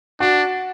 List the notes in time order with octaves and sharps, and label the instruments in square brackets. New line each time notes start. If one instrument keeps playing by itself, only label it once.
[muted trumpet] D4 [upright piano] F#4